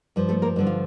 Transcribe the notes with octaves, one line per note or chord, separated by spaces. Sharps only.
G2 F3
A3 A4
A#3 A#4
G2 D3 F3
F4